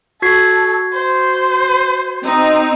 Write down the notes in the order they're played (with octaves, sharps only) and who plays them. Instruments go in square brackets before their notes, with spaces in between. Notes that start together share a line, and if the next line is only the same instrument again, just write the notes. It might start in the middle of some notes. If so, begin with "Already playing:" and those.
[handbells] F#4 G#6 C7 [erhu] A4
[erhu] C5
[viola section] C4 D#4